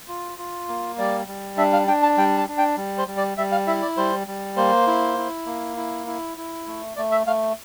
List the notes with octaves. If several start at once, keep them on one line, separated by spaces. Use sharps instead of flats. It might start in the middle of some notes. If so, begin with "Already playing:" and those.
F4
F4
A#3
G3 D5
G3
D4 E5
F5
D4 G5
A5
G3 G5
A5
D4
G5
G3
C5
G3
D5
G3 E5
F5
E4 E5
D5
G3 C5
G3
A#3 C5
E4
E4
A#3
E4
E4
E4
A3
A3 D5
E5
A3 F5